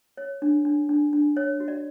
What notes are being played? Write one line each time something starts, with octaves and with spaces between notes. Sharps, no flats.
C#5
D4
D4
D4
D4
C#5
F#4
D5